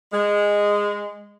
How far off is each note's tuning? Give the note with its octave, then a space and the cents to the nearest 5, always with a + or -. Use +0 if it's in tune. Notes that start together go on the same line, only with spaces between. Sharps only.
G#3 -15